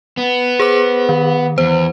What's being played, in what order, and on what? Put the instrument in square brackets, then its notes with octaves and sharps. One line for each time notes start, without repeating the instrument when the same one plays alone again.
[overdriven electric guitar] B3
[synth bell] G#4 C5 D6
D#3
[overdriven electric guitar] E2 [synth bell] C5